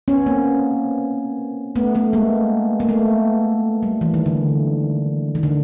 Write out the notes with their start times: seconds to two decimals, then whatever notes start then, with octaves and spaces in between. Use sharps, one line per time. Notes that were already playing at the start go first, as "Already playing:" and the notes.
0.08 B3 C#4
0.26 A#3 C4
1.76 A3 B3
1.95 A3 B3
2.13 G#3 A#3
2.80 A#3
2.89 A3 B3
3.83 G3
4.01 E3
4.14 D#3
4.26 D3
5.35 D#3
5.43 D3